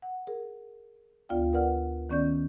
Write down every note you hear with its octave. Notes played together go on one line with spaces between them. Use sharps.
F#5
G#4 A#4
D2 B3 F4 D5 F5 G5
A#4 B4 D5 F#5 F6
D#3 B3 C#4 D5 G6